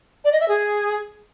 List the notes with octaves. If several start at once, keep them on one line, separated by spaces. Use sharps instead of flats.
D5
D#5
E5
G#4